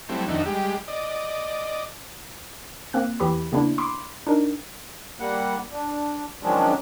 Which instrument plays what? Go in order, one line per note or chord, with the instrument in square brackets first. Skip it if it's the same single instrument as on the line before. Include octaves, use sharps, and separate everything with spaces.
[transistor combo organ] F#3 G3 A3 C4 E4
F2 D#3 D4 D#4 F#4 E5
G3 G#3 G4
D5 D#5
[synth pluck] A#3 C4 F#6
E2 E3 G4 B5
C#3 A#3 B3 D4 E4
B5 C6 D6
D4 D#4 A#4
[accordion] G3 A#3 F#5
D4
D#3 F3 F#3 G#3 C#4 D4